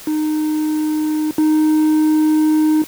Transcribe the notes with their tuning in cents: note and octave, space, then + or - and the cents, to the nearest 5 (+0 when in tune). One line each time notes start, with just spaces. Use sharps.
D#4 -20
D#4 -10